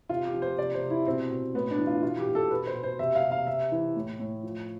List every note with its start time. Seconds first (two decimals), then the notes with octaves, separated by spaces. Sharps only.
0.09 C3 F4
0.25 G4
0.34 F3
0.42 C5
0.58 C3 D5
0.74 C5
0.82 C3
0.90 E4
1.06 B2 C4
1.30 B2
1.54 A2 B3
1.71 D4
1.78 E3
1.87 F4
2.02 B2 F4
2.19 G4
2.27 B2
2.35 A4
2.51 B2 B4
2.67 C5
2.75 B2
2.83 C5
2.99 C3 E5
3.15 F5
3.23 C3
3.31 F5
3.47 C3 E5
3.72 E3
3.96 A2
4.19 A2
4.43 F3